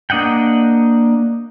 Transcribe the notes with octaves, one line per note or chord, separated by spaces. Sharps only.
A#3 D4 D#5 F#5 G5